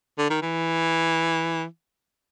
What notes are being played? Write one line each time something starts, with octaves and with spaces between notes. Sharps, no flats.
D3
D#3
E3